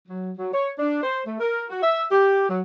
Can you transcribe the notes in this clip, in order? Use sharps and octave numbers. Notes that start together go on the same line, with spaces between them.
F#3
F#3
C#5
D4
C5
A3
A#4
F#4
E5
G4
F#3